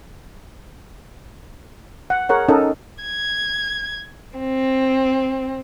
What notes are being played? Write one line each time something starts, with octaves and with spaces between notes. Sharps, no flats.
F#5
G#4 A#4 C#5 F#5
C#4 D#4 A4 A#4 D#5
G#6
C4